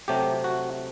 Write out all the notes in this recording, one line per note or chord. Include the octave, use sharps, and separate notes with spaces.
C3 F#3 A3 G4
F#4